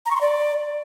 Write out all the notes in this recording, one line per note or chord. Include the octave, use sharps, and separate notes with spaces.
A#5
C#6
C6
D5